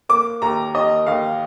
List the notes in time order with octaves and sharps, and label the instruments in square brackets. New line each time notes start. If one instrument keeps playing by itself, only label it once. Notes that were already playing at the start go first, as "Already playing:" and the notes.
[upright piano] A#3 D6
D#2 A#5
D#2 D#5
D#2 F5